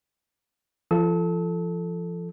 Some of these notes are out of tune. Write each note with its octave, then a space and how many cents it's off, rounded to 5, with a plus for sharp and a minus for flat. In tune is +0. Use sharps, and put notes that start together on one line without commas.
F3 -35 A4 +0 E6 -40